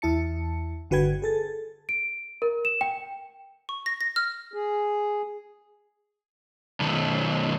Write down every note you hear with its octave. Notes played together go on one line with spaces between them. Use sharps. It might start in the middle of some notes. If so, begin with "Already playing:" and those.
E2 E4 A5 C#7
G1 D3 F#4 B4 G5 G#6
G#4 A4 A6
D7
A#4
E7
G5
C#6
A#6
A#6
F6
G#4
B1 D#3